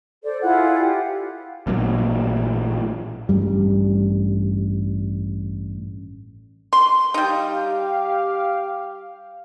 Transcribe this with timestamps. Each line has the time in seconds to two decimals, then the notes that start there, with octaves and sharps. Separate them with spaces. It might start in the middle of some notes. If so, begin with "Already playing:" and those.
0.23 A4 C5 D5
0.42 E4 F4 G#4 F#5
0.77 G4
1.67 A1 A#2 F#3
3.29 A1 G2 G3
6.73 C6
7.14 G3 D#4 G4 F5